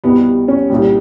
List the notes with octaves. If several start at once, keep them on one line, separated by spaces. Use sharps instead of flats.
C2 B2 G3 B3
C#4
C2 A#2 G3